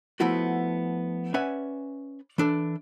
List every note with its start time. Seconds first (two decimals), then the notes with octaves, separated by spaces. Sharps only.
0.20 F3 A3 B3 E4 F#4
1.34 C#4 B4 D5 E5 F#5 G#5
2.38 E3 D4 A4